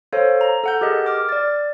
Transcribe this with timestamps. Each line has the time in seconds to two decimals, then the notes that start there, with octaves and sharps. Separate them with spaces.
0.13 A4 C5 C#5 F5
0.41 A#5
0.64 A4 F#5 G6
0.81 G4 G#4 A#4 D#5
1.06 D6 F6
1.29 D5 A6